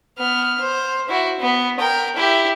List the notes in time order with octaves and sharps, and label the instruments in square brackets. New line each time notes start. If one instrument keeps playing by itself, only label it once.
[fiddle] B3 F6
C5
E4 F#4
B3
A#4 G5
E4 G4